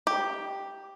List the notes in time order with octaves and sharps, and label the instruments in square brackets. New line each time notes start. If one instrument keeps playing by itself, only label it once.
[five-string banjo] G4